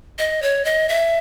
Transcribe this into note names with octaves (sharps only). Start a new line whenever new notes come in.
D#5
C#5
D#5
E5